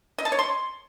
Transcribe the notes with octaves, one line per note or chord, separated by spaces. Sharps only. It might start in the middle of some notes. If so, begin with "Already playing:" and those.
D#5
A5
C#5
C6